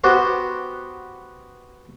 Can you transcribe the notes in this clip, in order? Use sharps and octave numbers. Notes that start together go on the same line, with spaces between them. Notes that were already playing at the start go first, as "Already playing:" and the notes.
B3 F#4 G4 C5